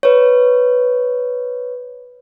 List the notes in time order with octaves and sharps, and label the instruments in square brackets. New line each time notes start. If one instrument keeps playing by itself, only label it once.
[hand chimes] B4 C#5